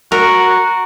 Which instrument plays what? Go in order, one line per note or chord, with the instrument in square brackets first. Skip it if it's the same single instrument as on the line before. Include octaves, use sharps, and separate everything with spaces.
[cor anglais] F#4 [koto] A#4